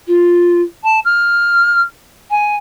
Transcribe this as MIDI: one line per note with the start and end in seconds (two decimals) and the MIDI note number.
0.07 0.61 65
0.83 0.99 81
1.04 1.81 89
2.30 2.56 80